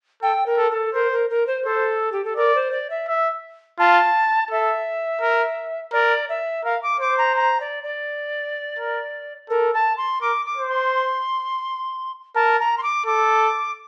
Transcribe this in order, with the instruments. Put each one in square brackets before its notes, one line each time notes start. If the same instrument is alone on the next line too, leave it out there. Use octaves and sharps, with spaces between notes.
[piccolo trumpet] A4 [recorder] G5
[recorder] A#4
[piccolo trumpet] A4
[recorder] A4
[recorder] A#4 [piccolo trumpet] C5
[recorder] A#4
A#4
C5
[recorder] A4 [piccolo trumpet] C5
[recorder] G4
A4
[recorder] A#4 [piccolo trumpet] D5
[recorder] C5
D5
E5
[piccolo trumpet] E5
[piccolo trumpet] F4 [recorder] A5
[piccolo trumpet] A4 [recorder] E5
[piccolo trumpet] A#4
[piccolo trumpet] A#4 [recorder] D5
[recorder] E5
[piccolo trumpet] A#4 [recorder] F5
[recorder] D6
[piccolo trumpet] C5 [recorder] D6
[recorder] A#5
A#5
D5
D5
[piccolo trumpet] A#4
[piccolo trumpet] A4 [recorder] A#4
[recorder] A5
C6
[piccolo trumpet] A#4 [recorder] D6
[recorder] D6
[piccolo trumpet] C5
[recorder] C6
[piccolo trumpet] A#4 [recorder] A5
[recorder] A#5
C6
D6
[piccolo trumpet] A4 [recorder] D6